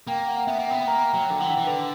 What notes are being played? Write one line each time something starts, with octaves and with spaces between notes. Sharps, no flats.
A#3 G5
F#5
B3 E5
A#3
B3 G5
A#3 A#5
F#3 G5
D3
G5
E3 F#5
E3
D3 B4